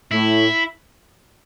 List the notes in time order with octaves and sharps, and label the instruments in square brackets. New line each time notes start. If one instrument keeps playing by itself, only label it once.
[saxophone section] A2 [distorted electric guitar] E4